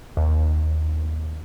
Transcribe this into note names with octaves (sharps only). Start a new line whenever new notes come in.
D#2